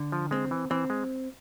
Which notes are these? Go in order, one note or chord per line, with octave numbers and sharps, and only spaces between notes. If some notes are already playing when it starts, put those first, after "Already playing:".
Already playing: D3
F3
G#3 C4
E3
E3 C4
G#3